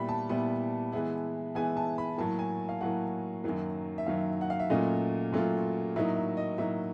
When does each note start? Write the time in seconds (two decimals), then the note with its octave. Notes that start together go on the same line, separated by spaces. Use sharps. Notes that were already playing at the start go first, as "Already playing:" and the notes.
Already playing: A#2 G3 B3 E4 B5
0.09 A5
0.29 A#2 G3 B3 E4
0.92 E3 G#3 B3 E4
1.55 E3 G#3 B3 E4 G#5
1.77 A5
1.98 B5
2.18 A2 F#3 A#3 A5
2.39 G#5
2.69 F5
2.81 A2 F#3 A#3 F#5
3.44 F#2 D#3 F#3 A#3
3.98 E5
4.06 F#2 D#3 F#3 A#3 F5
4.41 F#5
4.50 F5
4.60 E5
4.70 A#2 F#3 A3 C#4 F4 D#5
5.32 A#2 F#3 A3 C#4 F4
5.96 A2 F#3 A#3 D#4 E5
6.16 E5
6.37 D#5
6.58 A2 F#3 A#3 D#4 E5